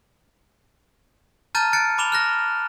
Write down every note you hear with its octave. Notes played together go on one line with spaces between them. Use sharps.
A5 A#5 F6 G6 A6 D#7
F#6 A6 C#7 D7
B5 D6 E7 F7 G7
F6 F#6 A#6